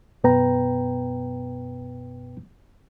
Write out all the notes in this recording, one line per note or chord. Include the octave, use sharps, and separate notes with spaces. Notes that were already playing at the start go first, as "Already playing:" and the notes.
F#2 B2 B3 B4 G5 A#5